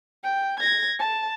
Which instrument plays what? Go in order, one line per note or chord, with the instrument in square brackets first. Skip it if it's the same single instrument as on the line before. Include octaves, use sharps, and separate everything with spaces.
[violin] G5
G#6 A#6
A5